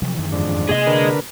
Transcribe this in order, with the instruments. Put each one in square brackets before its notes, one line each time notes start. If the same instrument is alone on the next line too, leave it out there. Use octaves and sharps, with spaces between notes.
[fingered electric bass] C3 F3 F#3
F#2 D#3 E3
[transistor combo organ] F2 G#2 D4
[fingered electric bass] C3 A#3 [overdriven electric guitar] G#4 D#5
[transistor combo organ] D3 A#4 B4